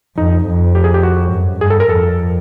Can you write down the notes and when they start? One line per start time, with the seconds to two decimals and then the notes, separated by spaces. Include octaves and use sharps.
0.17 F2 D#4
0.46 F2
0.75 G4
0.84 G#4
0.94 G4
1.03 F#4
1.32 F#2
1.61 G2 G#4
1.70 A4
1.80 A#4
1.89 F2 A4